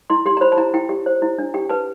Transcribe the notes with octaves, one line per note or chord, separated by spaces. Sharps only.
E4 C6
G4 C6
A#5
C5 B5
A5
E4 A#5
E4 G5
G4
C5
E4
D4
G4 G5
B4 A5